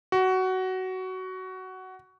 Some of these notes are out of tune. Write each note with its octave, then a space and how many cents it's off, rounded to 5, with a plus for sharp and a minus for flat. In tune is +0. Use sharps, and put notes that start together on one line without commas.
F#4 +15